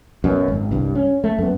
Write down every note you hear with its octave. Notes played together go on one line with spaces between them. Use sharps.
F#2 B2
G#1
C2 G2
C#4
A3
F#2 B3